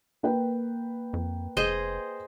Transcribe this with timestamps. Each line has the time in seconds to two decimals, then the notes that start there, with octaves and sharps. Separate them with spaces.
0.23 A#3 B4 G5
1.13 F2
1.57 F1 G#4 C5 D#5